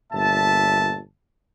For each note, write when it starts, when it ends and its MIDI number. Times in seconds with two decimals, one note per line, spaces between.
0.13 1.00 31
0.13 1.00 46
0.13 1.00 76
0.13 1.00 81